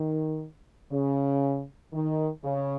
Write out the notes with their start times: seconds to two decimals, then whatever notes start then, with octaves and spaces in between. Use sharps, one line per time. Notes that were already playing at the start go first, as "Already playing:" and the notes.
Already playing: D#3
0.92 C#3
1.93 D#3
2.44 C#3